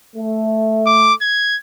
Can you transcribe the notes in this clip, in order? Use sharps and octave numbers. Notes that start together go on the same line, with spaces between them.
A3
D6
G#6